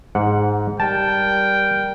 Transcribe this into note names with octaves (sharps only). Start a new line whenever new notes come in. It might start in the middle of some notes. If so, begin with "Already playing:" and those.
G#2 F#5
G3 A#4 G5 A5